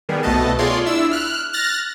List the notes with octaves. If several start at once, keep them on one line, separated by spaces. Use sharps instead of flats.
D#3 G3 B3 G#4
C2 B2 A3 B3 D#5 A5
F4 G#4 C#5 D5 C6
D4 E4 E6
F6 F#6
F6 F#6 A6 A#6